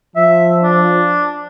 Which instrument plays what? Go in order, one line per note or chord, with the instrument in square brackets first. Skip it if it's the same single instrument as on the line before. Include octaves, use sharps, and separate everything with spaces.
[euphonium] F3 [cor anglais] E5
[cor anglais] D4